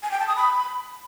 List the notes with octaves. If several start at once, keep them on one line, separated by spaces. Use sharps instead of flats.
G#5
G5
A5
D#6
B5